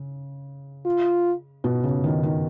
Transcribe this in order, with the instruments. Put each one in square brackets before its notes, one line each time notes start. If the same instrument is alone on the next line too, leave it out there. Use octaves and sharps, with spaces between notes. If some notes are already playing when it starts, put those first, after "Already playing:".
Already playing: [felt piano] C#3
[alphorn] F4
[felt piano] B2
C#3
D#3
D#3